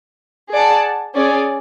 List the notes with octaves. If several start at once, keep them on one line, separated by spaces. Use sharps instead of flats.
G#4 D5 F#5 A5
C#4 G#4 D5